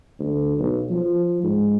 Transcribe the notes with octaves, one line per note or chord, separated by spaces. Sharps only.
D2
B1
F3
G#2